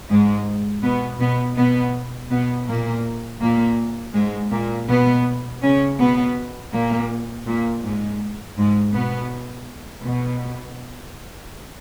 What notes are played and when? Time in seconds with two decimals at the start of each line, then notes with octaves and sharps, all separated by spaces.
0.09 G#2 G#3
0.83 B2 B3
1.20 B2 B3
1.57 B2 B3
2.31 B2 B3
2.68 A#2 A#3
3.41 A#2 A#3
4.15 G#2 G#3
4.52 A#2 A#3
4.89 B2 B3
5.63 C#3 C#4
5.99 B2 B3
6.73 A#2 A#3
7.46 A#2 A#3
7.84 G#2 G#3
8.58 G#2 G#3
8.94 B2 B3
10.04 B2